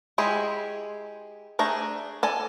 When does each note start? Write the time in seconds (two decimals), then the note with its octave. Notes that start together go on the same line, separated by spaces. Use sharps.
0.18 G#3 E4 G4 G#4
1.59 A3 D4 G#4 A#5
2.23 A4 D5 G#5